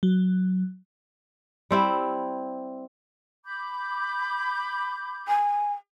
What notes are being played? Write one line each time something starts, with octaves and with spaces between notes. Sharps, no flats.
F#3
G3 C4 E4
B5 D6 G6
G#5